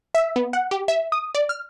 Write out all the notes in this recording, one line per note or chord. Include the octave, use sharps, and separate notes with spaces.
E5
B3
F#5
G4
E5
D#6
D5
F6